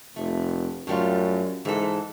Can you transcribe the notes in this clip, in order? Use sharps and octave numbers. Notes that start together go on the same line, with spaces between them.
F1 A3
F#2 A2 G3 F4
G#2 E3 A4